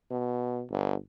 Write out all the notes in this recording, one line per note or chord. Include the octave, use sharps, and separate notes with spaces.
B2
G1